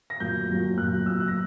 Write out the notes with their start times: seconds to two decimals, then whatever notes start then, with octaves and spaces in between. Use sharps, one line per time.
0.10 A#6
0.20 A#2 F#3 G6
0.48 A#2 F#3
0.78 A#2 F#3 F#6
1.05 F#3 E6
1.10 A#2
1.20 F#6
1.28 A#6